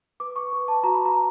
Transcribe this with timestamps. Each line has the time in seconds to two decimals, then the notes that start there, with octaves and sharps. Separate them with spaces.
0.20 B4 D6
0.36 C#6
0.53 B4
0.68 A5
0.84 F#4 A#5
0.94 B5
1.05 A#5